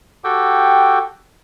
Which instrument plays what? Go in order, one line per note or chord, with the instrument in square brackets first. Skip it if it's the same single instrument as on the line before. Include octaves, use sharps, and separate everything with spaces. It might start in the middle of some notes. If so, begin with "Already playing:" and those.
[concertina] F#4 G4 A4 G5